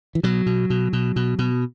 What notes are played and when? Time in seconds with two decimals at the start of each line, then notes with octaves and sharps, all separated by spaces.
0.15 E3
0.23 B2 F#3
0.46 B2
0.70 B2
0.93 B2
1.16 B2
1.39 B2